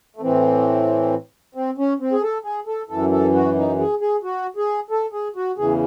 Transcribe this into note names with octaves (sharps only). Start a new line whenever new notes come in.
A3
A2 E3 C4
C4
C#4
C4
G#4
A4
G#4
A4
F#2 E3 A4
A4
F#4
D#4
G#4
G#4
F#4
G#4
A4
G#4
F#4
E2 C#3 E3 G#4